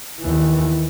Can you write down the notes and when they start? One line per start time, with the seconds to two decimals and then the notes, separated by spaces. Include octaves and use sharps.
0.20 D#2 E3